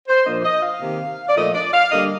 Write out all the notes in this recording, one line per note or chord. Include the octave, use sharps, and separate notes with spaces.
C5
A#2 F3 A#3 D4 D#5
D#5
F5
C3 D#3 A#3
D5
A#2 F3 A3 D#5
D5
F5
D3 G3 A#3 D4 D#5